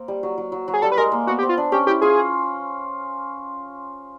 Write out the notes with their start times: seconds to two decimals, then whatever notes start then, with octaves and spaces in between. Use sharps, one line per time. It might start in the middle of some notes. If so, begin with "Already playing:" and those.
Already playing: A#3 C4
0.08 G3
0.23 F#3
0.38 F#3
0.52 F#3
0.68 F#3
0.74 G#4
0.82 G3 A4
0.92 B4
0.97 G#3 A#4
1.12 A#3
1.27 B3 F#4
1.39 G4
1.43 C4
1.49 F4
1.57 D4
1.72 C#4 G4
1.87 E4 G4
2.02 F4 G#4